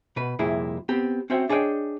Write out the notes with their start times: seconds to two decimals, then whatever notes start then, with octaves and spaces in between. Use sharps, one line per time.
0.16 B2 B4
0.39 C2 F2 A#2 E4 G4 G#4
0.89 B3 C4 G4
1.30 C4 C#4 F#4 C5 E5 G5
1.49 D4 G#4 C#5 D#5 F5 G5